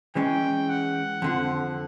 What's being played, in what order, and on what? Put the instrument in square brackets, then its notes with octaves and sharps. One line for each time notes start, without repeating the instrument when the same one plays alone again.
[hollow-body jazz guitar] E3 G#3 C#4 [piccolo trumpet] G5
[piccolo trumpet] F#5
[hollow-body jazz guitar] F2 D3 F3